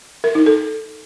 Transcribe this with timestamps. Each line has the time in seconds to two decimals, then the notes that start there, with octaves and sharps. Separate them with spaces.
0.24 A#4
0.35 D#4
0.46 A4